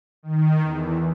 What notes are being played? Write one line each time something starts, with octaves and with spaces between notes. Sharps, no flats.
D#3
E2